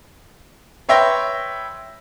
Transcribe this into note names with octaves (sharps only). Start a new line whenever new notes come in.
B4 C#5 E5 G5 C6 A#6